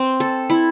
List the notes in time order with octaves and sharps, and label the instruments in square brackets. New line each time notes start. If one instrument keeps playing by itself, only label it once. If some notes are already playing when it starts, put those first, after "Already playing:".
Already playing: [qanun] C4
A4
E4